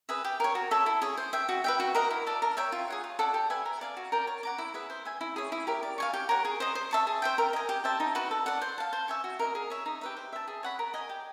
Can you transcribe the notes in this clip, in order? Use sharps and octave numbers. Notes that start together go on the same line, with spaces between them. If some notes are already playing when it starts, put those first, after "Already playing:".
G#4 B4 E5
G4
A#4 C#5
F#4
A4 C#5 E5
E4
G#4 C#5
C5
E5 G5
F#4
B4 E5 G5
F#4
A#4 D#5 F#5
E4
A4 D5
A#4
C#5 E5 G5
F4
G#4 C#5 F#5
F4
A4 D5 F#5
G4
B4 E5 G#5
A#4
D5 F5 G#5
F#4
A#4 D5 G5
C#5
F#5 A#5 D6
E4
G#4 B4 E5
C5
E5 G#5
E4
G#4 C#5
E4
G4 A#4 C#5
D5
F5 G#5 C#6
G4
A#4 C#5 F#5
G#4
C5 D#5
C5
E5 A5 C#6
G#4
C5 E5 G5
A#4
D#5 G#5
G4
C5 E5 A5
D#4
F#4 B4
A4
D5 F#5
C5
F5 A5
C5
E5 G#5 C#6
F#4
A#4 D#5
G#4
C#5 E5
D#4
G4 B4 E5
C5
E5 A5
G#4
C#5 F#5 B5
A#4
D#5 G#5
G4